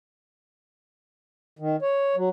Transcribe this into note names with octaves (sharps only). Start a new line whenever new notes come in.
D#3
C#5
F#3